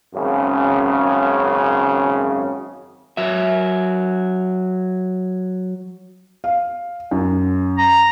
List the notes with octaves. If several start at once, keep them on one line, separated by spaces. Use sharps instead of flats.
G#1 F#2 C#3
F#3 E5
F5
F#2
A#5